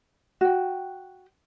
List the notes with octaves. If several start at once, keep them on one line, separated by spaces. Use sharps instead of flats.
F#4 G5